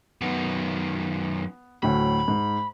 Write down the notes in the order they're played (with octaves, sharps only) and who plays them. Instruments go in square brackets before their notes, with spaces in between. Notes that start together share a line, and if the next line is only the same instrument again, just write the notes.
[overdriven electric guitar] F#2 D#3 [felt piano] B3
[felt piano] D2 A2 F#3 [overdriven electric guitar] B5
[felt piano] G#2